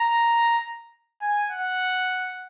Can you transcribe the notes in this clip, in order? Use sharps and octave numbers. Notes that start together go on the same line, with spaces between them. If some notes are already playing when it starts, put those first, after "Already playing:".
Already playing: A#5
G#5
F#5